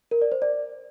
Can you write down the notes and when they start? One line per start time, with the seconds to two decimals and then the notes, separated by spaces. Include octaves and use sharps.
0.11 A#4
0.22 D5
0.32 C5
0.42 D5